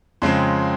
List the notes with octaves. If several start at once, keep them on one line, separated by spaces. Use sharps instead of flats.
F2 C#3 G#3 C4 C6